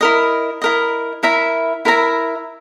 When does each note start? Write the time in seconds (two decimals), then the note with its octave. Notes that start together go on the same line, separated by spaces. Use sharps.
0.01 E4 A#4 D#5
0.62 E4 A#4 D#5
1.23 E4 A#4 E5 A#5
1.85 E4 A#4 E5 A#5